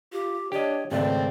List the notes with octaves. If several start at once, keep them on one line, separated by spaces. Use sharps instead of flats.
F4 G4
D4 G4 C#5 D#5
G#1 C#2 A3 C4 D5